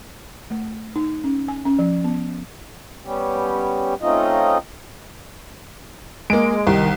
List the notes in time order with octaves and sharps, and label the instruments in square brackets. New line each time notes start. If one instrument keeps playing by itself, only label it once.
[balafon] A3
D#4
C#4
G#5
C#4
F3
B3
[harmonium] G3 B3 C#4 G4
A3 C4 C#4 D#4 F4 D#5
[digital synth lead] G#3 [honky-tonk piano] A#3 D7
[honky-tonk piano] C2 [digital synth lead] D#3